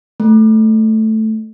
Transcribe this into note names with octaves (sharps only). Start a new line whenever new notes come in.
A3